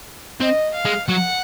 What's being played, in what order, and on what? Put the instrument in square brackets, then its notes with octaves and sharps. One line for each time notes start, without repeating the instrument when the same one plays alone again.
[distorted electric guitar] C4 [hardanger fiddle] D#5
[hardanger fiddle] F5
[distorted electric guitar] G#3
[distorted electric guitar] F#3 [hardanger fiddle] F#5